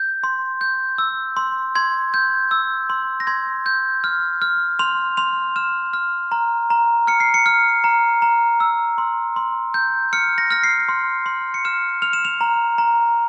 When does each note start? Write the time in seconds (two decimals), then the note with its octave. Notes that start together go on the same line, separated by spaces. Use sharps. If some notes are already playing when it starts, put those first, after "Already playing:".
Already playing: G6
0.24 C6
0.61 G6
0.98 E6
1.37 C6
1.75 C6 G#6
2.14 G6
2.51 E6
2.90 C6
3.20 A#6
3.27 C6 G#6
3.66 G6
4.04 F6
4.42 F6
4.79 C6 F7
5.17 C6 F7
5.56 F6 E7
5.93 F6
6.32 A#5
6.70 A#5
7.07 F6 C#7
7.20 C7
7.34 C#7
7.46 F6
7.84 A#5
8.22 A#5
8.60 E6
8.98 C6
9.36 C6
9.74 G6
10.13 F6 C#7
10.38 A#6
10.50 F6 A#6
10.63 C7
10.89 C6
11.26 C6
11.54 C#7
11.65 F6 E7
12.02 F6 F7
12.13 E7
12.25 F7
12.41 A#5
12.78 A#5